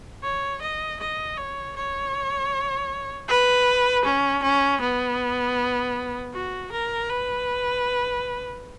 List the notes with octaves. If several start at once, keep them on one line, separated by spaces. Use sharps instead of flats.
C#5
D#5
D#5
C#5
C#5
B4
C#4
C#4
B3
F#4
A#4
B4